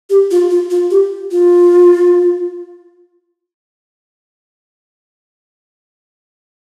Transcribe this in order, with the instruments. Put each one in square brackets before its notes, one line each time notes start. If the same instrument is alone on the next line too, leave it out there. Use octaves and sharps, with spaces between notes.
[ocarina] G4
F4
F4
F4
G4
F4